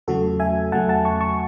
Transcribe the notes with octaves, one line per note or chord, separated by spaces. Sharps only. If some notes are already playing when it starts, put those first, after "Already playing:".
E2 C#3 F#3 A3 F#4 A4
E5 G#5
E2 C#3 F#3 A3 F#5 A5
F#5 A5
A5 C#6
A5 C#6